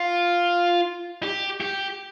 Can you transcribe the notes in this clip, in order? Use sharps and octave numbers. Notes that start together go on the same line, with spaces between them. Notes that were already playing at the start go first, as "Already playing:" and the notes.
Already playing: F4
G4
G4